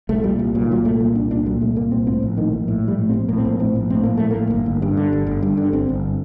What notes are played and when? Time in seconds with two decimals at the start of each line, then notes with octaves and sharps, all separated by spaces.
0.09 C2 A3
0.24 A#2 G3
0.39 C2
0.55 A#2 F#3
0.64 D#3
0.69 C2 F#3
0.85 A#2 A3
1.00 C2 A#3
1.15 A#2 D4
1.31 C2 D4
1.46 A#2 F#3
1.61 C2 A3
1.76 A#2 A#3
1.91 C2 C4
2.07 A2 C4
2.23 A#1
2.37 A2 D#3
2.53 A#1
2.68 A2
2.83 A#1 G3
2.98 A2
3.09 C4
3.14 A#1
3.28 A2 A#3
3.37 C4
3.45 A#1 A#3
3.60 A2 C4
3.75 A#1
3.90 A2 C4
4.03 A#1 A#3
4.17 A2 A3
4.31 A#1 A#3
4.50 G1
4.66 G1
4.82 G2
4.97 D3
5.13 G1
5.27 G1
5.42 G2
5.57 D3
5.73 G1 C4
5.89 G1